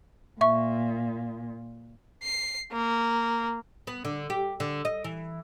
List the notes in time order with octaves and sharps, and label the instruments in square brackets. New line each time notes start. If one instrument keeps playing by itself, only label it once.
[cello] A#2 [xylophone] E5 C#6
[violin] C7
A#3
[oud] B3
D3
G4
D3
D#5
E3